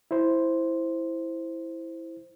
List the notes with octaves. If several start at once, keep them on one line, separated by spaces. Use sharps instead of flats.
E4 C5